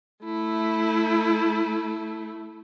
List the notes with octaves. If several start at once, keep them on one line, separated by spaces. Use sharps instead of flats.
A3 E4